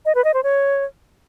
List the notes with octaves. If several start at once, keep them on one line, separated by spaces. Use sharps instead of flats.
D#5
B4
D#5
C5
C#5